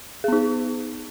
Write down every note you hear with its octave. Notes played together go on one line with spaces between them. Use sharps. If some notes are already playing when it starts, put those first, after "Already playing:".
B3 D#4 G#4